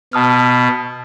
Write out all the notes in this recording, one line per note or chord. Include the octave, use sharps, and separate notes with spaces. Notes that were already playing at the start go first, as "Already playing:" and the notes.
B2 A5 D#6 F6